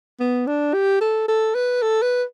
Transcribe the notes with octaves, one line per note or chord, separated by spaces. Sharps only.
B3
D4
G4
A4
A4
B4
A4
B4